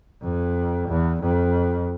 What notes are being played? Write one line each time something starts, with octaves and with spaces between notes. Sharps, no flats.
F2
E2
F2